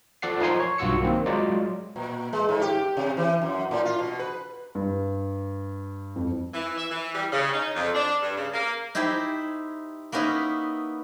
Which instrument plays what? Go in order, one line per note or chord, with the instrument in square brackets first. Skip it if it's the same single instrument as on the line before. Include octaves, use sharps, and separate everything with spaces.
[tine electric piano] F3 A4 D5 F#5 C7
F3 D#4 A#4 G#5 C6 C7
C#5
B1 G2 F4 F#4 E6 C#7
D#3 A#3 C4
F#3 G#3 F4 D5 D#5
[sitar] A#2
G#3
G#2
G4
C3
E3
F#2
A2
F4
B2
B4
[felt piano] G2
F2
[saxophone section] E3
E5
E3
G3
C#3
D#4
F2
D4
G2
C#3
A#3
[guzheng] D#4 E4 G4 C5 G#5
A#3 B3 C#4 D#4 E4 B4